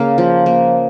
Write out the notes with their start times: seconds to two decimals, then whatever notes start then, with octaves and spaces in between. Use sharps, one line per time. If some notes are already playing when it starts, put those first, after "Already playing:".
Already playing: C#3 A#3 F5
0.18 F3
0.46 A#3